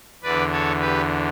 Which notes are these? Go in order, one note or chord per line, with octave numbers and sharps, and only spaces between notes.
E2 D3 B4 D5
A4 C#5
G4 B4